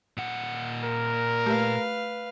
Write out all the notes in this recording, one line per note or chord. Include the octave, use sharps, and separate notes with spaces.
A#2 F#5
A#4
A3 G4 B4 F5